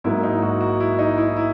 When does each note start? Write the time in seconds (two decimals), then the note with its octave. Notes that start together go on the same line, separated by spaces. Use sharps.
0.04 G#2 F#3 A#3 E4
0.23 D#4
0.42 F#4
0.61 F#4
0.80 E4
0.99 D#4
1.17 E4
1.37 E4